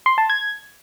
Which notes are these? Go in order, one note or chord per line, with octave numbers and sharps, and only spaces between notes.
C6
A5
G#6